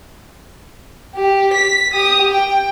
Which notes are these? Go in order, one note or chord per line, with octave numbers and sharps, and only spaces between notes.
G4
B6
G4 D#6
G5